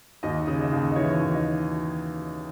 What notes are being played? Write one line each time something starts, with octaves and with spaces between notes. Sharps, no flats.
D#2 D#5
C#3
D#5
D#2
D#5
E3 C#5
D#2
D#5